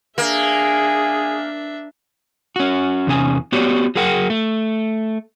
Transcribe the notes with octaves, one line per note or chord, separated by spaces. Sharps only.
A#3 D4 G#4 E5
C#4 F#4
E2 C3 C#4 G#5
B3 F#4 G4 C#5 D5
F#3 G#4 A#4 F#5 G5
A3